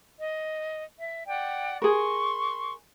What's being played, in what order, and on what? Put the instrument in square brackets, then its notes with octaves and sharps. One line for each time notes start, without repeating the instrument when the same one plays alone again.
[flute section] D#5
E5
D5 F#5 G5
[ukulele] G#4 A#4 [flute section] C6 C#6